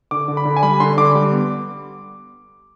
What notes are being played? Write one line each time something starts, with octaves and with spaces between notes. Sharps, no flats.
D3 D6
D3
B5
D3
G#5
G3 B5
D3 C6
D3 D6
G3
B3